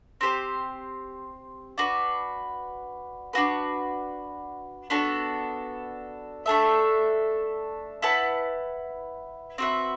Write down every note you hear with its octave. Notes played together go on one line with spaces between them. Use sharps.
C4 G4 C5
D4 F#4 B4
D4 F#4 B4
B3 D4 F#4 A4
A3 D4 A4 E5
E4 B4 F#5 A5
C4 F#4 B4 E5